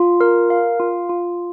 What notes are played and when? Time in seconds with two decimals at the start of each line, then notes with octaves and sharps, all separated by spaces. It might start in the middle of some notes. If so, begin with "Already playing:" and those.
Already playing: F4
0.21 A#4
0.50 F5
0.80 F4
1.09 F4